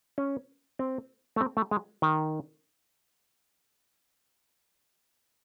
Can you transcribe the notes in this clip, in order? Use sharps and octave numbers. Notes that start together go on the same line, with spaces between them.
C#4
C4
A3
C4
A3
G#3
D#3